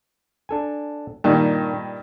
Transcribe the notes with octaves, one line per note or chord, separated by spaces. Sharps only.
D4 A4 G#5
G2 A#2 D#3 A#3 D#4